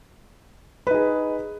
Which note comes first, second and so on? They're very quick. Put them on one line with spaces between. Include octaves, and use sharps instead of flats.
B4 D#4 G#4